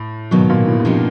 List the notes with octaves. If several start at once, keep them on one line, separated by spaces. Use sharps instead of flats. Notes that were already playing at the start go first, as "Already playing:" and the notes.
Already playing: A2
G#2 B2 D#3 F#3 A#3
A#2
A2
G2
C3 F3 A#3 D#4 G4